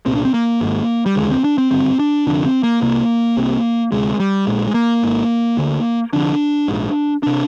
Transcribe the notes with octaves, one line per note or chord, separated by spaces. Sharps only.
C2 A#2 C4
D4
C4
A#3
G#1 G#2
G3
F1 D#2 D3 G#3
C4
D4
C4
G#1 G2 D3 C4
D4
F1 F2 D3 D4
C4
A#3
C2 C3 A#3
C2 C3
D2 C3 G#3
G3
A#1 A#2 G#3
G#3
A#3
G#1 G#2
D2 D3
F1 F2 D3 D4
A#1 G#2
C3 D4